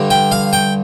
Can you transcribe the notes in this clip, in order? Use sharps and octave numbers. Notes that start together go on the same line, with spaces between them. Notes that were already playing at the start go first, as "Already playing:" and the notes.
Already playing: G2 D3 G3
G5
F5
G5